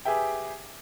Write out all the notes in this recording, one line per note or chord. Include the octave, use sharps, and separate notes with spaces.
G4 G#4 B4 E5 G5